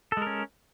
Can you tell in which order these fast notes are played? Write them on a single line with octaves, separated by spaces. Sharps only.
A4 G#3 A#4 C#4